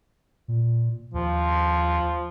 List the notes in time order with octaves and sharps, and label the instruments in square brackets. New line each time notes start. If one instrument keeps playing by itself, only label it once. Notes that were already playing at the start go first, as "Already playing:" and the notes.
[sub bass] A#2
[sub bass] D#2 [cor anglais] F3